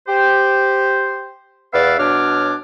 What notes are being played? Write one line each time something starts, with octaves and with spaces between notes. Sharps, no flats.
G4 C5
E2 B3 B4 D5 E5 F5
B2 F#3 D4 C#5 D6 F6